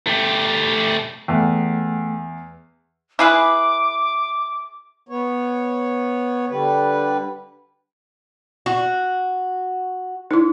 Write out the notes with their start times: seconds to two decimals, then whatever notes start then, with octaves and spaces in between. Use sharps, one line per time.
0.07 A3 G4
1.28 E2 A3 F#5 G5
3.19 E4 G#4 B4 D6
5.09 B3 C#5
6.49 D3 G3 B4
8.66 F#4
10.31 D#4 E4